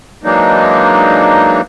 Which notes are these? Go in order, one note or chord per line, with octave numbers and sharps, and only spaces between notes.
E3 F#3 G#3 A#3 D4 D#4